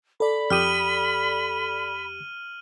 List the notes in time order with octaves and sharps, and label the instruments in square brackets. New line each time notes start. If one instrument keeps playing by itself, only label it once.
[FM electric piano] A4 D5 [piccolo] B5
[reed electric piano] F2 G4 D#6 [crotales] F6 D#7 F#7